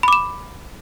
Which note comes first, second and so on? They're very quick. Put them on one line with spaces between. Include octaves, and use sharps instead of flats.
B5 D6 E7